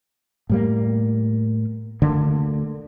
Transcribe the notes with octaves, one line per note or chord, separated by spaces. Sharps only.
A2 G3 A#3
D2 D3 A#3